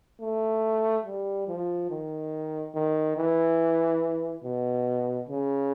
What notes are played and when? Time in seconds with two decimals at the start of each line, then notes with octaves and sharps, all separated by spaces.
0.21 A3
1.05 G3
1.48 F3
1.90 D#3
2.75 D#3
3.17 E3
4.44 B2
5.29 C#3